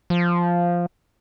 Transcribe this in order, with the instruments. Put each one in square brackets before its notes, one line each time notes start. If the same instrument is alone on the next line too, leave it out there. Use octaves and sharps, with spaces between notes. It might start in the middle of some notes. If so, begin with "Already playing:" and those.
[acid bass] F3